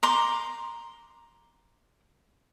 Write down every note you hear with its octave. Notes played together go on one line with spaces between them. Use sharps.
A#5 C6 D6